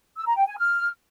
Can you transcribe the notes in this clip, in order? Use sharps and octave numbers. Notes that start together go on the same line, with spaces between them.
E6
A#5
G5
G#5
F6